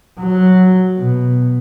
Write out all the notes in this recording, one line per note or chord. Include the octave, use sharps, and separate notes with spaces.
F#3
B2